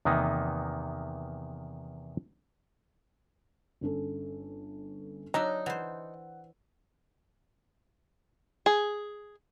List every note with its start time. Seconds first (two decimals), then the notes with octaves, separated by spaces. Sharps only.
0.05 E2 C3 D#3 A#3 B3 D#4
3.81 G1 C#4 A4
5.34 F#3 D4 D#4 E5
5.66 E3 C5 F#5
8.66 G#4